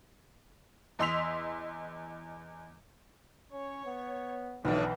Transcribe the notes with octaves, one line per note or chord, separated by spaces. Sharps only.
E2 D#5 C6 E6 B6 F7
C#4 C#5
B3
B1 A2 D3 E3 F3